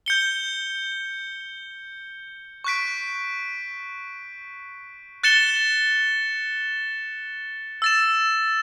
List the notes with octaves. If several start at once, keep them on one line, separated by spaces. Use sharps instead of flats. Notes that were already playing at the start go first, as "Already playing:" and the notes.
G6 C#7 G7
C#6 F#6 B6 D7
F#6 A6 C#7 E7 G7
E6 A6 E7